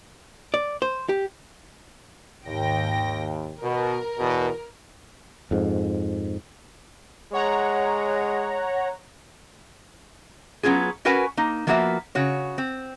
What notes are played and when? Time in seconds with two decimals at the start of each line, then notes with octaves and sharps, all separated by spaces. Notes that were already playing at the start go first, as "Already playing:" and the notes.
0.54 D5
0.82 C5
1.09 G4
2.46 G#1 D#2 G5 A#6
3.62 B2 A#4
4.19 E2 B2
5.51 F2 G#2
7.33 G#3 C#5 F#5 A#5
10.63 F#3 B3 C#4 F4 G#4
11.05 C#4 F#4 A#4 B4 F#5 G#5
11.37 A#3 D#4
11.67 F3 A#3 B3 F#4 C5 E5
12.15 C#3 F#4 C#5
12.58 C4